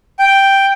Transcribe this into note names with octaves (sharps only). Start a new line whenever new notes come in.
G5